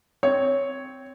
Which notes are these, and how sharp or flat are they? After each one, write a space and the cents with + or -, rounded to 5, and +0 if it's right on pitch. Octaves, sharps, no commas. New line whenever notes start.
C4 -10 C#5 +0